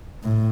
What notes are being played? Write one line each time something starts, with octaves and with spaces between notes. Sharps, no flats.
A2